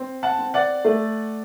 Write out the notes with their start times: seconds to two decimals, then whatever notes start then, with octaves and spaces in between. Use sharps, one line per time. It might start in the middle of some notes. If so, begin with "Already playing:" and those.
Already playing: C4
0.23 F#5 A5
0.39 C4
0.54 D5 F#5
0.85 A3